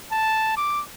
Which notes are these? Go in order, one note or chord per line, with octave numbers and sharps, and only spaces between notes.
A5
D6